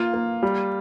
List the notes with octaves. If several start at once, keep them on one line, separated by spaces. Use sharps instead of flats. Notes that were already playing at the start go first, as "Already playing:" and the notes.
Already playing: A#3 F4
A#3
G3